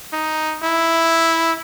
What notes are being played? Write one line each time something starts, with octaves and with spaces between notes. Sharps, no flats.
D#4
E4